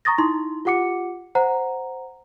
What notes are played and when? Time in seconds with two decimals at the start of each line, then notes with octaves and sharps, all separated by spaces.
0.05 A#5 C#6 D#6 A6 A#6
0.18 D#4 E4 C6
0.65 F4 G4 F#5 D6 C#7
1.35 C5 F#5 A#5